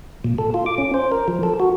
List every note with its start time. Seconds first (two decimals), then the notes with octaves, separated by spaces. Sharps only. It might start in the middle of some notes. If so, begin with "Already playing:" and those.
0.24 A#2
0.38 A4
0.54 F4
0.66 D6
0.78 C#4
0.94 C5
1.12 A#4
1.28 F3
1.43 A4
1.60 F#4